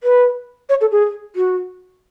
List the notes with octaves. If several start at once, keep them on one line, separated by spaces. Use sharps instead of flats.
B4
C#5
A4
G#4
F#4